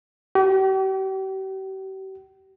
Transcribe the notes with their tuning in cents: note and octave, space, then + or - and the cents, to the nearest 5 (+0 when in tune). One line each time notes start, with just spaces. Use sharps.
G4 -40